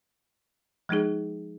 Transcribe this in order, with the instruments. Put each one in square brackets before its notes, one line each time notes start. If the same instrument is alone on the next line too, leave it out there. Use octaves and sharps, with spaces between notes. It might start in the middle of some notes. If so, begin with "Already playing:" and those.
[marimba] F3 G#3 D#4 G#4